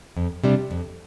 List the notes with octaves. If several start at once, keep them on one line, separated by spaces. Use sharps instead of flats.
F2
C3 G3 D4
F2